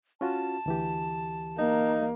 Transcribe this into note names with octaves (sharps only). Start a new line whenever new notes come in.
C#4 F4 F#4 A5
D2 E3 G4
A#3 D#4